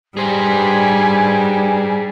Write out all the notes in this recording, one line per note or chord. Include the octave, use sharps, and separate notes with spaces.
G2 G3 G4 G#4 C5 G#5